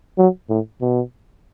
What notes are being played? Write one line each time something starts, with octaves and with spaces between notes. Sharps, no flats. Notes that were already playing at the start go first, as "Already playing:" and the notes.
F#3
A2
B2